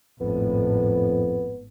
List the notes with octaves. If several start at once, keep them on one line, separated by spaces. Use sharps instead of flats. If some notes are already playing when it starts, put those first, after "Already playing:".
G#1 F2 A2 B3